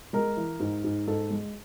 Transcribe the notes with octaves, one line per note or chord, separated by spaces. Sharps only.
G#3 A#4
E3
G#2
G#2
G#2 A4
G#3